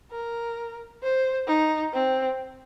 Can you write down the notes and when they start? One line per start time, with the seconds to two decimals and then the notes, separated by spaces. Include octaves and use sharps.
0.12 A#4
1.03 C5
1.48 D#4
1.93 C4